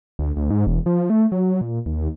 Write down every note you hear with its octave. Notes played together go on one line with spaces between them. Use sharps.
D2
D2
G#2
E1
F3
A3
F#3
A#2
D#2